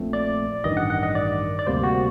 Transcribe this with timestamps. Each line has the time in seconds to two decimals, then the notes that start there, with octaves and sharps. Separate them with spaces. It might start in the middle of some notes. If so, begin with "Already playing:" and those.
Already playing: A#1 A#2 A3 C4
0.13 D5
0.64 A1 G2 D#3 G3 D#5
0.77 F#5
0.90 F#5
1.03 D#5
1.15 D5
1.59 D5
1.67 D2 C3 G3 A#3 C5
1.83 F#4